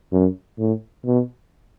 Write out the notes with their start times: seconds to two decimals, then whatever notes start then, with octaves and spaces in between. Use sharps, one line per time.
0.12 F#2
0.59 A2
1.05 B2